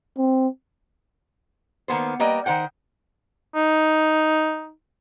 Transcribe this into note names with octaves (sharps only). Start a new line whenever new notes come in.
C4
D#3 A#3 B3 C5
G3 A#3 B4 D#5 G5
D#3 C5 F#5 G5
D#4